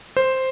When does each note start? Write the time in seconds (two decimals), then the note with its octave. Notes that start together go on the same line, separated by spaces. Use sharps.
0.17 C5